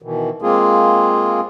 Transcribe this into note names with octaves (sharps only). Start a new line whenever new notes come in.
B2 D#3 E3
G#3 A#3 C4 F4 G#4